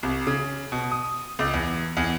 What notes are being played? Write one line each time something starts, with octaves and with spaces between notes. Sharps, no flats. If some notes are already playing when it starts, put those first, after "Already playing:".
C2
C#3
B2
D#6
C#2
E2
E2